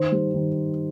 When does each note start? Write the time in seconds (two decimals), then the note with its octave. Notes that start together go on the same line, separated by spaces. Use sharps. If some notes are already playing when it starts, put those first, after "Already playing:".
Already playing: D#3 C5
0.12 G3
0.34 D#3